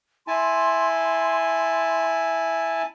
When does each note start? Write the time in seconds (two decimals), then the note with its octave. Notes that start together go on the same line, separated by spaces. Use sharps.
0.27 E4 G#5 A5 C6